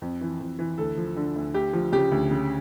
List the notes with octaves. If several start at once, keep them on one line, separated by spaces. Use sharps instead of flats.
F2
E3
F2
E3
D2 A4
F3
D3
D2
D2 G4
F3
C#3 G4
D2
C#3